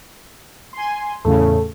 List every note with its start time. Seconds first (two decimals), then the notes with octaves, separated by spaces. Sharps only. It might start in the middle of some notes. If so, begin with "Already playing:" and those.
0.73 G#5 C6
1.25 E2 A2 C#3 A3